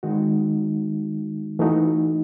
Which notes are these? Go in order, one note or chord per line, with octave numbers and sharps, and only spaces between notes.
D#3 G#3 D#4 F#4
E3 A3 D#4 F#4